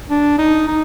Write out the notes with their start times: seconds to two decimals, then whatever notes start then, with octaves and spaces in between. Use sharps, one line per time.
0.10 D4
0.38 D#4
0.68 D#4